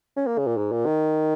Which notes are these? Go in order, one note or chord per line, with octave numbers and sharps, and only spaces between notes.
C#4
A#3
C#3
A#2
G#2
A#2
D#3